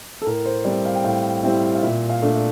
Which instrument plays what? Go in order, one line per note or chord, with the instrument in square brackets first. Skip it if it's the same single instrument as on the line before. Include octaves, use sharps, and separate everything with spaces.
[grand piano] A4
A2 A#4
C5
G3 C4 E4 D5
F5
G5
A2 F5
G3 C4 E4
F5
A#2 E5
F5
A3 D4
E5